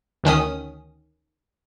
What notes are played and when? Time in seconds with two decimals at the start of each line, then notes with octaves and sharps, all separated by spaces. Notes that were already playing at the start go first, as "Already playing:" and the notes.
0.24 D2 D#3 C#4 D#6